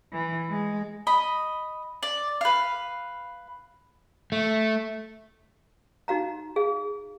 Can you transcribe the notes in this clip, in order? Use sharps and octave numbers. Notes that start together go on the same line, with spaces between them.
E3
G#3
D#5 B5
D5
B4 F5
A3
D#4 F#4 F5 A#5
G#4 F5